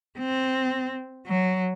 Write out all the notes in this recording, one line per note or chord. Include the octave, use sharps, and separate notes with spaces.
C4
F#3